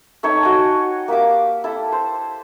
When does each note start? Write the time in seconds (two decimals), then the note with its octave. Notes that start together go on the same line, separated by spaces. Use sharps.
0.23 A3 D#4 C#5 G5
0.43 F#4 D#5 G5 G#5
1.08 A#3 G4 E5 D6
1.64 E4 A4
1.92 C5